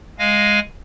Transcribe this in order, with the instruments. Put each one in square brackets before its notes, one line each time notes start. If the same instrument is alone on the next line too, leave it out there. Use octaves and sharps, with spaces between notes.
[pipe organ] G#3 F5 G#5 A#6